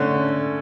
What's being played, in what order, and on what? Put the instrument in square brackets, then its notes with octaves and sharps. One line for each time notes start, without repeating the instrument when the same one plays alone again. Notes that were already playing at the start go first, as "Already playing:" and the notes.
Already playing: [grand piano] D3 A3 [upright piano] C#4